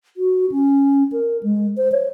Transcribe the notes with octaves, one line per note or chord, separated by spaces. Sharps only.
F#4
C#4
A#4
G#3
C5
C#5